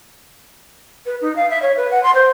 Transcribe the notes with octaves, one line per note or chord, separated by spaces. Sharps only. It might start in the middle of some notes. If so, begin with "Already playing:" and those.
B4
D#4
F5
E5
C#5
B4
F#5
C6
C5